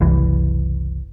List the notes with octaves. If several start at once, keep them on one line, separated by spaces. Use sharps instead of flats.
F#1 C2 E3